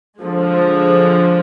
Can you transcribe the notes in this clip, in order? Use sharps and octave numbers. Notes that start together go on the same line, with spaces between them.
D3 F3 G#3